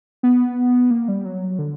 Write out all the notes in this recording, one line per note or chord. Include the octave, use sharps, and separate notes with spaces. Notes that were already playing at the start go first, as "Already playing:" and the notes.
B3
A#3
G3
F#3
D3